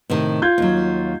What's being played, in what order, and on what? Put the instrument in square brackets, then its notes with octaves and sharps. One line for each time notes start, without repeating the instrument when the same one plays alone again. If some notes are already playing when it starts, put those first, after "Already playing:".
[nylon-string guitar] A2 C3 D#3
[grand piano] F4 G6 G#6
[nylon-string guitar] D#2 F#3